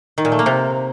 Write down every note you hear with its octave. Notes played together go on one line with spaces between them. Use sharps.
D#3
A#2
A3
A#3
C3